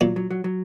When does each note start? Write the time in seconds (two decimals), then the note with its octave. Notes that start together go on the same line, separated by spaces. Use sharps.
0.01 A#2 F#3
0.16 F#3
0.31 F#3
0.44 F#3